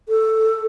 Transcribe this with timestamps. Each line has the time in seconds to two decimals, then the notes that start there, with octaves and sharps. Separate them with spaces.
0.08 A4